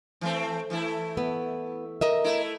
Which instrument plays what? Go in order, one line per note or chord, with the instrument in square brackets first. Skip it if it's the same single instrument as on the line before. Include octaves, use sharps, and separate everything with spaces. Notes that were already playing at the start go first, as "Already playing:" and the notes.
[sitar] E3 A3 C4
E3 A3 E4
[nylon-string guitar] B3
A#4 D#5 E5
[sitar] A3 E4